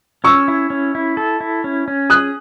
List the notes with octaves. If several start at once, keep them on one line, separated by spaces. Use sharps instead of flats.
C#4 C#6 E6
E4
C#4
E4
A4
E4
C#4
C#4
G#4 D#6 F#6